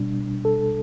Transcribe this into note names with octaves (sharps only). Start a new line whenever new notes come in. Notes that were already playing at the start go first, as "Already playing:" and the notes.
Already playing: B2 G3 D4
A4